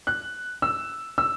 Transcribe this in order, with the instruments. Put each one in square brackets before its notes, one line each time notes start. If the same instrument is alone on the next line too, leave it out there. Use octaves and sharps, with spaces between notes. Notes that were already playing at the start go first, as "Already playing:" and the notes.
[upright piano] F#6
E6
E6